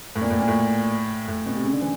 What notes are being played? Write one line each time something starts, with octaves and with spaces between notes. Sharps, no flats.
A2
A#2
A2
A#2
A2
A2
B2
C3
C#3
D3
E3